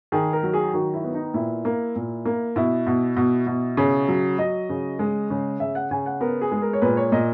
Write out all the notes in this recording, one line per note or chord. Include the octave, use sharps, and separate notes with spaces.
D#3 G#4
A#4
F#3
G#4
D#3 F#4
E4
B3
D#4
A#2 E4
A#3
A#2
A#3
B2 E4
B2
B2
B2
C#3
F#3
F#3 D#5
C#3
G#3
C#3
C#3 E5
F#5
C#3 G#5
F#5
B3 A#4
G#4
G#3
A#4
C#5
A#2 B4
C#5
A#2 D#5